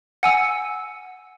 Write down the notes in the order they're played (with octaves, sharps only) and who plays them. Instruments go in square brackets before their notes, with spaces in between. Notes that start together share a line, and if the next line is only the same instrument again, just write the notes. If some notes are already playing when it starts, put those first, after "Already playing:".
[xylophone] F#5 G#5 E6